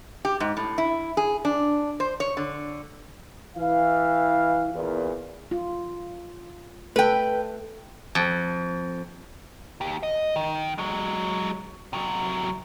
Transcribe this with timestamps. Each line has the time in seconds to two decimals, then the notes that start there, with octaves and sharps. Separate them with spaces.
0.25 G4
0.40 G#2
0.57 A2
0.78 E4
1.17 G#4
1.45 D4
2.00 C5
2.20 C#5
2.37 D3
3.57 E3 F5
4.74 E2 A#2
5.51 F4
6.96 A3 A4 B4 G5
8.15 F2
9.81 D#2 G4
10.03 D#5
10.36 D#3
10.78 F#3 G#3
11.93 C3 F#3